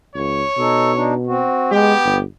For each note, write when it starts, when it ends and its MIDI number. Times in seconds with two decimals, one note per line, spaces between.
0.15 0.44 37
0.15 1.13 73
0.58 1.47 47
0.58 0.92 63
0.58 0.92 69
0.94 1.14 62
0.94 1.14 63
1.27 1.71 60
1.27 1.71 66
1.72 1.94 56
1.72 2.18 59
1.72 2.18 67
2.04 2.24 31